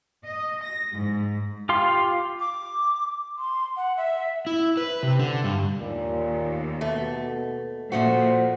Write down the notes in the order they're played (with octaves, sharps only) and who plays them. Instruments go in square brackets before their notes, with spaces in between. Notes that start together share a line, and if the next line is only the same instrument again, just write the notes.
[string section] D#5
A#6
G#2
[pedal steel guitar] F4 G4 F5 C6
[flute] D6
[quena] C6
F#5
E5
[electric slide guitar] E4
B4
C3
D3
G2
[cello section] D#2 [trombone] A#2
[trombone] B2 [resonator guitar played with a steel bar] A3
[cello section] A#2 [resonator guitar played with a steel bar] F3 A3 F#4 [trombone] C5